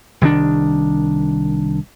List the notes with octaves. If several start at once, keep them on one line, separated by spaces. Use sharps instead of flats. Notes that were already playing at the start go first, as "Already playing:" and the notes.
C2 D#3 F#3 D4